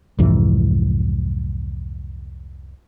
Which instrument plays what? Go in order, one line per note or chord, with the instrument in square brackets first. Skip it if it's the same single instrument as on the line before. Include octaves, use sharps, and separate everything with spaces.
[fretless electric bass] C2 F2 G#2 E3